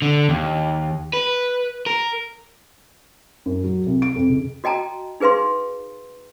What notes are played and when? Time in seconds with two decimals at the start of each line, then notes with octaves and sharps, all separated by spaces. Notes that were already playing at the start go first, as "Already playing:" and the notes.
0.02 D3
0.29 D#2
1.13 B4
1.86 A#4
3.46 F#2
3.64 F#3
3.86 C2
4.02 D7
4.16 F2
4.30 C#2
4.64 F#4 D#5 G5 A5 A#5
5.20 D#4 G#4 B4 F5 C6